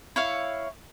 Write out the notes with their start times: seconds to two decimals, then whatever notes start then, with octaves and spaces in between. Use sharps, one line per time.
0.16 E4 C#5 F5